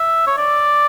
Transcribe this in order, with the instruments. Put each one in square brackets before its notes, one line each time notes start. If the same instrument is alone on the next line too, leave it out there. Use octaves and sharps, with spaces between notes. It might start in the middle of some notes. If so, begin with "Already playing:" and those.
Already playing: [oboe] E5
C#5
D5